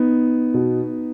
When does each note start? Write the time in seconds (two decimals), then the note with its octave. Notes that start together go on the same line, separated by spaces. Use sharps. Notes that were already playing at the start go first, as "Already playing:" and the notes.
Already playing: B3 D#4
0.54 B2